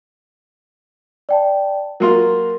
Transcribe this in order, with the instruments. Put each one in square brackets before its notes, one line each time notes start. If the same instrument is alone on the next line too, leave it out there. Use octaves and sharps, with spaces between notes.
[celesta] D5 G5 A5
[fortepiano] F#3 A#3 F4 [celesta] A#4 C6